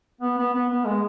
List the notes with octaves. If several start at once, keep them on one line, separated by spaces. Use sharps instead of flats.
B3
B3
B3
B3
G#3